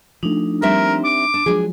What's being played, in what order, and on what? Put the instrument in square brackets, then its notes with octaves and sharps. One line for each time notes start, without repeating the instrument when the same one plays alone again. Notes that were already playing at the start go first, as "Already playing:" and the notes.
[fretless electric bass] F3 A3 [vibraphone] D4 D#4
[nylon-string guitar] G3 C4 E5 [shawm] A#4
[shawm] D6
[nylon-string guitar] D4
[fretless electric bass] F3 F#3 G#3 [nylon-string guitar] D4 G#4